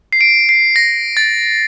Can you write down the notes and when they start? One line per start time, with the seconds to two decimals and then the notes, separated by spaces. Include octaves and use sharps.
0.13 C7
0.21 D7
0.49 C7
0.76 A#6
1.17 A6